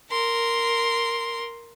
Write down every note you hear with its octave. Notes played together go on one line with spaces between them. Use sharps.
A#4 C6